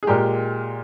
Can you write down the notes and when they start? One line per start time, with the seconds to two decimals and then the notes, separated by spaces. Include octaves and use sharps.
0.03 G#4
0.07 A#2 G#3 G4 A#4